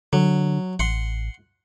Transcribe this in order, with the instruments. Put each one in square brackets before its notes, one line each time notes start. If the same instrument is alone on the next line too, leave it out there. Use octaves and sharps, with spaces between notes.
[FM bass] D3 [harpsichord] F#3
[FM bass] A1 [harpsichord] F#5 C6